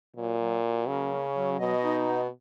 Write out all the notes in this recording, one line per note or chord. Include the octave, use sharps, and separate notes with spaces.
A#2 F#3
F#3
F#3
C#3 A#3
C#4
F#3
B2 D#5
D#4
B3